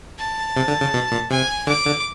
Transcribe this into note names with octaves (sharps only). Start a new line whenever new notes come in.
A5
C3
D3
C#3
B2
A#2
C3 G#5
D3 D6
D3